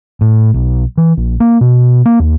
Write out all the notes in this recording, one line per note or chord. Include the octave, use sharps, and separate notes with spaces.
A2
B1
E3
A#1
A#3
B2
A#3
D#2